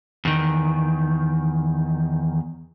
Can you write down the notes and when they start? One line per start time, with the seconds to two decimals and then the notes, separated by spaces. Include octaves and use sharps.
0.25 E2 D#3